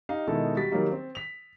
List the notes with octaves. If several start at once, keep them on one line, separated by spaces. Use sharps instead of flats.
D#4 G4 F5
B2 D#3 G#3 D#4 E4 A4
G3 F#4 A6 B6
D#3 F#3 G3 A#3 D#4
C4
B6 F7